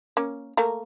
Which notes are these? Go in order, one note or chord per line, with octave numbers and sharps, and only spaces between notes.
A#3 C#4
A3 A#3 A#4